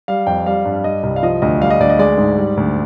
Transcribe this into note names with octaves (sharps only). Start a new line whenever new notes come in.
G3 F5
F2 G5
G3 F5
G2
F5
G3 D#5
C2
F5
F3 D#5
D2 D#5
G3 F5
D#5
D2 D5
D#5
G#3 D5
G#2
G3
D2